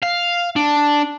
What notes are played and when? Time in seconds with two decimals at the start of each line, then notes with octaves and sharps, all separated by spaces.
0.03 F5
0.56 D4